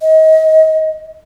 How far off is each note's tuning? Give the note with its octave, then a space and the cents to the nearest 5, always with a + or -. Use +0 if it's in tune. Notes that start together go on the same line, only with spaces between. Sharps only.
D#5 +30